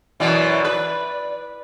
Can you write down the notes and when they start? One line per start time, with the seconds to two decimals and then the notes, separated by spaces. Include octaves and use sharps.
0.20 F#2 B2 E3 D5
0.64 B4